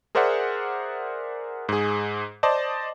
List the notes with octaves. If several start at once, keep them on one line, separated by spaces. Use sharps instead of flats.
G#4 A#4 C5 D5 E5 F#5
G#2 G#4
C5 D5 D#5 A5